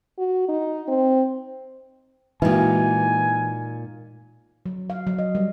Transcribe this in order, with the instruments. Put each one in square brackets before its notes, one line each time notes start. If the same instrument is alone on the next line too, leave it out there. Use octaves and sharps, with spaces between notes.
[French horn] F#4
D#4
C4
[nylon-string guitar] A#2 D#4 [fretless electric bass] E3 [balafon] G#3 A#3 F#4 [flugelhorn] G#5
[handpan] F#3
F5
F#3
D#5
G3